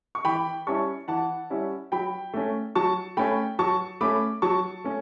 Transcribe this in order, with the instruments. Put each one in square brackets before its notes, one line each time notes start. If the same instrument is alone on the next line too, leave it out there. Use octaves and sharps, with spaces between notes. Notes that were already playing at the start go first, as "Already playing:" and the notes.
[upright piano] C#6
E3 G5 B5
G3 C#4 E4 A5 C#6
E3 F#5 A5
G3 C#4 E4
F#3 G5 B5
A3 C#4
F#3 A5 C#6
A3 C#4 G5 B5
F#3 A5 C#6
A3 C#4 B5 D6
F#3 A5 C#6
A3 C#4